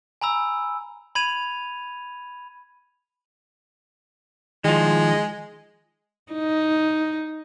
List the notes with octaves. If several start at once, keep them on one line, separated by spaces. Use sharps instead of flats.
G#5 A#5 B5 E6
B5 G#6 D#7 F7
D#3 F3 G#3
D#4